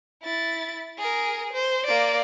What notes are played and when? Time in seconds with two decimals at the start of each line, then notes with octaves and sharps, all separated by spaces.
0.23 E4 A6
0.99 G#4 A#4
1.53 C5
1.87 A#3 D5